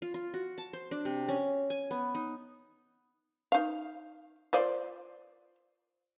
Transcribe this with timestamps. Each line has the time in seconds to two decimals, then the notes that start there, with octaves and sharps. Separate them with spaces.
0.02 F4
0.14 F4
0.34 F#4
0.58 A5
0.73 C5
0.91 D4
1.05 C3
1.29 C#4
1.70 G#5
1.91 B3
2.15 D#4
3.52 D#4 F5
4.53 F4 C5 D5